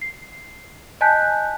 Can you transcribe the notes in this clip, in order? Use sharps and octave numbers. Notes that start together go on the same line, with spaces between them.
C7
D#5 G#5 A5 F#6 G6 B6